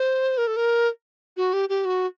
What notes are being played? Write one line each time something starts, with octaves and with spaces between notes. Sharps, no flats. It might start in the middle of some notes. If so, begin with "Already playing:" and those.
Already playing: C5
A#4
A4
A#4
F#4
G4
G4
F#4